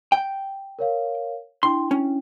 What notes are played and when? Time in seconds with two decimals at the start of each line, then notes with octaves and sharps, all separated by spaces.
0.12 G5
0.79 A#4 C#5 F5
1.63 D4 E4 G5 C6
1.91 C#4